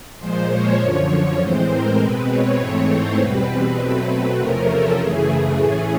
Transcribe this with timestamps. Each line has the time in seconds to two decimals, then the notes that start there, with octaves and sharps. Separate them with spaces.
0.19 A#2 F3 G#3 C5
0.49 C#5
0.80 F#2 D3 F3 C#5
1.39 A2 E3 G#3 C4 C5
1.70 A#4
1.99 B2 G#3 C4 B4
2.29 C#5
2.59 G#2 E3 A3 C4 C#5
2.88 C5
3.18 E2 B2 G3 C4 B4
3.78 B2 F#3 A3 C4
4.38 E2 C3 F3 A3 C#4 A#4
4.68 A4
4.98 F#2 C#3 E3 A3 G#4
5.28 G#4
5.57 A2 E3 A3 C#4